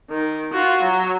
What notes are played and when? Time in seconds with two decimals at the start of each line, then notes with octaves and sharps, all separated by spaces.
0.10 D#3
0.52 F4 F#4
0.83 F#3